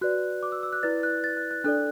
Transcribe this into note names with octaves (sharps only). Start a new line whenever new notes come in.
F#4 B4 D5 F#6
D6
E6
E6
F#6
E4 B4 D5 A6
F#6
A6
F#6
F#6
D4 A4 D5 F#6